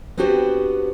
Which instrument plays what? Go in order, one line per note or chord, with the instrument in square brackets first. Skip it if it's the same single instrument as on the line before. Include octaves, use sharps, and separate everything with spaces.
[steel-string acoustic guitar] B3 C4 D4 F#4 G4 C5